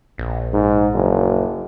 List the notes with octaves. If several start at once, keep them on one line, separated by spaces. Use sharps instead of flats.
A#1
G#2
F#1